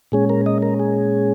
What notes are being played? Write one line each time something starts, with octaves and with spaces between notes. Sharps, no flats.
A#2 G#3 C#4 G#4
A#4
D#5
A#4
G#4